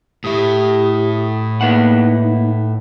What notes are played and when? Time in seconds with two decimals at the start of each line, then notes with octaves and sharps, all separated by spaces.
0.24 A2 E4 G4 D#6
1.61 A#3 D#4 B4 E5 F#5